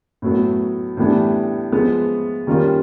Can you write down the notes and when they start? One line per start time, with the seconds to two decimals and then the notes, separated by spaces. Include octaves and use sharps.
0.22 A2 F#3 B3
0.97 A2 E3 G3 B3 D4
1.72 F3 G#3 B3
2.47 D#3 G3 A#3 C#4 F4